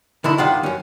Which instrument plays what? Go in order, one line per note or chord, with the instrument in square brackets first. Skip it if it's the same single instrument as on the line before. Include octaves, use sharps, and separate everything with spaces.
[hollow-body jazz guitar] D3 D#3 E4
G2 D#3 F4 F#5
F#2 C#4